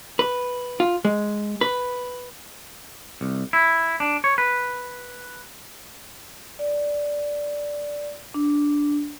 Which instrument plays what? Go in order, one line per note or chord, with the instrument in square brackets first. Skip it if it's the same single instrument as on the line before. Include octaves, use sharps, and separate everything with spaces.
[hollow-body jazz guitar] B4
F4
G#3
B4
[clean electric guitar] C2
E4
D4
C#5
B4
[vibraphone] D5
D4